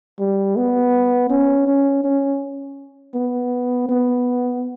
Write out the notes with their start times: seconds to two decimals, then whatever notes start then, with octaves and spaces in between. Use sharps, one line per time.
0.20 G3
0.57 B3
1.30 C#4
1.68 C#4
2.04 C#4
3.15 B3
3.89 B3